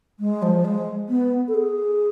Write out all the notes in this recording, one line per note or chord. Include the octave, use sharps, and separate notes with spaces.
G#3
F3
G#3
B3
A4
G#4